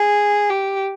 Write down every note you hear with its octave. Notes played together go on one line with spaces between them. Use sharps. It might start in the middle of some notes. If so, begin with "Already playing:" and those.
Already playing: G#4
G4